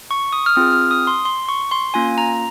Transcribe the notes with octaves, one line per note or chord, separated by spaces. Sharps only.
C#6
D#6
F6
C4 F4 G#4 D#6
F6
D#6
C6
C6
C#6
C6
A#3 C#4 F4 G#5
A#5